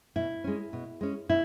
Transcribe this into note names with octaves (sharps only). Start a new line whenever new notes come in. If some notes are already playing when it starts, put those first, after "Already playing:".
B2 E4
G#3 C#4
B2
G#3 C#4
B2 E4